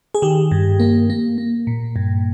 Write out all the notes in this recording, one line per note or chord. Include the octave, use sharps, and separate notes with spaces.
G#4
D#3 G4
G2
A#3
A#3
A#3
A#2
G2